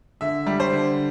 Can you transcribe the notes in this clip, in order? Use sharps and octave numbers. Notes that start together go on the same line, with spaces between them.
D3 E5
G3
C5
D3